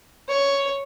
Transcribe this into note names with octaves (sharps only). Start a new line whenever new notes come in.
C#5